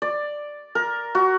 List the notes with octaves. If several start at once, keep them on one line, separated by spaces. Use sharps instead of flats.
D5
A#4
F#4